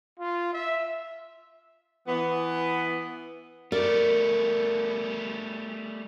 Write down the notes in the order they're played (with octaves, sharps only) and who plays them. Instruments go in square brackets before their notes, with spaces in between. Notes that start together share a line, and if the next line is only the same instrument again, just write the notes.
[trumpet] F4
E5
[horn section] E3 B3
[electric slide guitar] G3 A3 [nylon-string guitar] A#4 D5